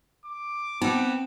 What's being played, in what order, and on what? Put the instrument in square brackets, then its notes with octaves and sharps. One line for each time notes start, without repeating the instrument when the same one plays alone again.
[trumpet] D6
[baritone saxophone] B3 [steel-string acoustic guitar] C4 [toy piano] D#4 G5